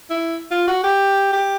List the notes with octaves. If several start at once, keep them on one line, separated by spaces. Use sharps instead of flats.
E4
F4
F#4
G4
G4